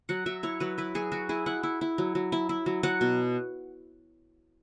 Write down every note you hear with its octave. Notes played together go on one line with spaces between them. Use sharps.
F#3 F#5
F#3 E5
E4 C#5
F#3 B4
E4 B4
F#3 G#4
F#3 F#4
E4 G#4
E4 F#5
E4
E4
F#3
F#3
E4
E4
F#3
F#3 F#5
B2